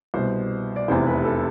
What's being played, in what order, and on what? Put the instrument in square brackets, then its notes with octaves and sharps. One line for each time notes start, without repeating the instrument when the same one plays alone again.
[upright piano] C2 B2 C5
D5
F1 E2 C3 E3 C5
B4
A4